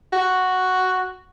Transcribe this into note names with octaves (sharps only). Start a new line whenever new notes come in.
F#4